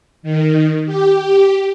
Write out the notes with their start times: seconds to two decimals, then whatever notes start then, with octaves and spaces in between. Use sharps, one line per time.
0.23 D#3
0.86 G4